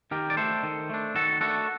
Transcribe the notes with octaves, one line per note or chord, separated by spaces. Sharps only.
D#3 G4 A#4
D5
A3 D4 A4 C5
D#3
A3 D4
D#3 F#4 A4
A3 D4 F#4 A4